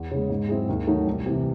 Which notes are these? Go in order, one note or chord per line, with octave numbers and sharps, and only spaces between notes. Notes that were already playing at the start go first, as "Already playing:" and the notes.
Already playing: E2
C#3 G#3
G#2
F#3 C4 E4 G#4
D#2
D#3 F#3 A3 D#4
C2
C3 E3